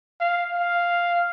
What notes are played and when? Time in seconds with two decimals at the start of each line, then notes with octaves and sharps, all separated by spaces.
0.21 F5
0.53 F5